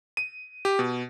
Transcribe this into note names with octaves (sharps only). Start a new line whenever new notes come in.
D#7
G4
B2